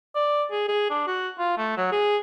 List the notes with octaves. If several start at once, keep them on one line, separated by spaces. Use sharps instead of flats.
D5
G#4
G#4
D4
F#4
F4
A3
F#3
G#4